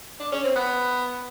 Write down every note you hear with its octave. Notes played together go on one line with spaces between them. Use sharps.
D4
C#4
C4
B3